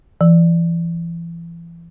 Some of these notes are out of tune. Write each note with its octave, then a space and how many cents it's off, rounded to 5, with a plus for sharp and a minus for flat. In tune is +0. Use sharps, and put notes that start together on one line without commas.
E3 +35